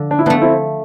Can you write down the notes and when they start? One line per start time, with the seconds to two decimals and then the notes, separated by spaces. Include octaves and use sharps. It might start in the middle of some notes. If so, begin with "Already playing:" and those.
Already playing: D3 F3
0.11 D4
0.19 E4
0.26 F3 B3 D4
0.30 A3
0.42 C4 E4